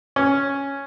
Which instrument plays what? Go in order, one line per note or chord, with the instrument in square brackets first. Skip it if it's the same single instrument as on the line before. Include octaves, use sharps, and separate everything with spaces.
[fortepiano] C#4